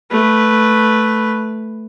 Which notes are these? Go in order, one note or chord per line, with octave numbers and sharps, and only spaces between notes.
A3 B4